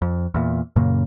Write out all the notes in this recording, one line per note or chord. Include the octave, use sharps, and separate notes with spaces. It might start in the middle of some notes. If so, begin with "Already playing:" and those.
F2
E2 A#2
F#2 A#2 C#3 A#3